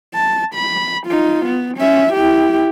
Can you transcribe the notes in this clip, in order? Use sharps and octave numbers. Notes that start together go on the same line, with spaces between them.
A5
B5
D#4 F4
B3
C#4 E5
E4 G4